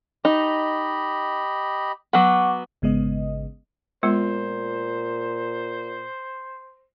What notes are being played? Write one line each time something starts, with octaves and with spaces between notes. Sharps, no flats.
D#4 G4 D#5 B5
F#3 B3 F#5 C#6 D6
G#1 C#3 G#3 B3 D#5
A#2 G#3 B3 F4 C5